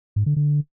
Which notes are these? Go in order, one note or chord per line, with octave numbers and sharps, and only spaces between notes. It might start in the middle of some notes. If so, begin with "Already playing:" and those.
G#2
D3
D3